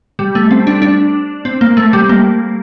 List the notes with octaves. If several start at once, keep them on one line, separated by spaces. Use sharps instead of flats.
G3
A3
C4
D4
D4
C4
A#3
A3
G3
A#3